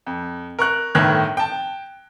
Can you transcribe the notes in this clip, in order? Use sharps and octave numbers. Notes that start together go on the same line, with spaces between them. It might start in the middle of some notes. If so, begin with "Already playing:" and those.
F2
A#4 C#6 F#6
G1 A2 D#3 F#6 G#6
G5 A5